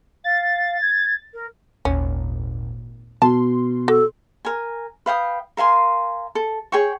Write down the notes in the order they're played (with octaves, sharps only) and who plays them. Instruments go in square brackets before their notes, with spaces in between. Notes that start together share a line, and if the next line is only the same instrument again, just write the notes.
[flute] F5 [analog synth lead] A6
[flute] G#6
A#4
[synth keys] G#1 D#2 A#2 [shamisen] C#4
[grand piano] B2 [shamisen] A5 [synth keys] C6
[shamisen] F#4 [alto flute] A4
[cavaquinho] A#4 G#5
B4 F5 G5 D#6
A#4 F5 G#5 C6
A4
G#4 C#5 G5 C#6